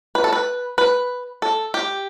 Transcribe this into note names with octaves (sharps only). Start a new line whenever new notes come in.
B4
A4
B4
B4
A4
G4